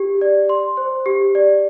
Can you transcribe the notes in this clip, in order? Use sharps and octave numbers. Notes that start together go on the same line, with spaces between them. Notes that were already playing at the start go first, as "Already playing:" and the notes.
Already playing: G4
D5
C6
C5
G4
D5